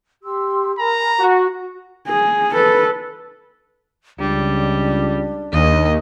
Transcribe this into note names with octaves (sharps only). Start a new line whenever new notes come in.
G4 C6 E6
A#4 G#5 A#5 B5
F#4 C#6
G#4
A4 B4
C#2 G3 D4
D#2 D#5